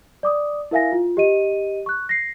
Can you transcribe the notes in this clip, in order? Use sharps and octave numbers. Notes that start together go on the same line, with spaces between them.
D5 D6 D#6
E4 A#4 E5 F5 G#5 A#6
F4
G4 D#5 D#7
C#6 F#6
A#6 C7